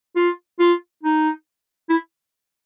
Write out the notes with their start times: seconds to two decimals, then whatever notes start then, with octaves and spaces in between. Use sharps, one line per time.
0.16 F4
0.60 F4
1.03 D#4
1.90 E4